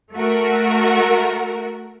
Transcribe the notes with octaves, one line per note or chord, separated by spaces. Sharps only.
A3 F#4 A#4